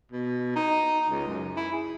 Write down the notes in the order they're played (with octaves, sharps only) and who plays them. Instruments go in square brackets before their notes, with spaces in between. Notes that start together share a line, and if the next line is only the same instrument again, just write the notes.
[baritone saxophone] B2
D#4
C#2
F#2
E4
G#4